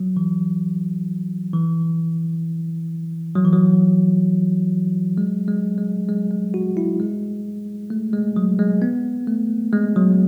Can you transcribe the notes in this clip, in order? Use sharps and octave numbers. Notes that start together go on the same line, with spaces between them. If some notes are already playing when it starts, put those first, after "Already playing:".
Already playing: F#3
E3
E3
F#3
E3
F#3
G#3
G#3
G#3
G#3
G#3
F#4
E4
G#3
A3
G#3
F#3
G#3
B3
A3
G#3
F#3